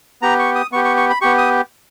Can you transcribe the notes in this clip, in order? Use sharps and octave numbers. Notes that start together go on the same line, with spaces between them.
B3 G4 A#5
C#6
D#6
B3 G4 C#6
C#6
C#6
B5
B3 G4 C#6
D#6